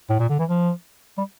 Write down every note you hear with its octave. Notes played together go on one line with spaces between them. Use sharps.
A2
A#2
D3
E3
F3
G3